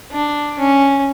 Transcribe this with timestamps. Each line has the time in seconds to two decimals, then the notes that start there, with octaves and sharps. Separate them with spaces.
0.11 D4
0.59 C#4